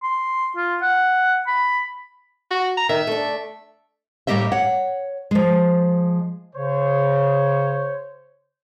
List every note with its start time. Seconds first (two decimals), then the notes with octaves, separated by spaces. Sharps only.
0.03 C6
0.56 F4
0.82 F#5
1.47 B5
2.51 F#4
2.77 A#5
2.89 D#3 E5
3.07 A3 D4
4.27 A2 G3 A#3 G4 D#5 E5
4.52 C#5 F#5
5.31 F3 G#3
6.56 C#3 C5 C#5